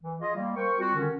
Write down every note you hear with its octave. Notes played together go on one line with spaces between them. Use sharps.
E3
F4 G#4 D#5
G3 A#3
A#4 C5 G5 C#6
G3 C4 F4 F#4
D3 D#3 C#4